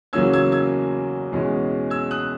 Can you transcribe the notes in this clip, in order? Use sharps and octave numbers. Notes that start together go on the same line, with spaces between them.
E2 C#3 F#3 A#3 C#4 E6 G#6
E6 G#6
E6 G#6
E2 B2 G#3 C#4
E6 G#6
D#6 F#6